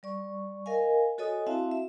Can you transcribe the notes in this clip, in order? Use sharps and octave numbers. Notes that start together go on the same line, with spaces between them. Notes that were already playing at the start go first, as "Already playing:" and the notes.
G3 D5 C#6
A#4 D#5 F5 G#5
F#4 A4 C#5 D#5 G#5 D#6
C4 E4 F#4 E5 F5 A5
E5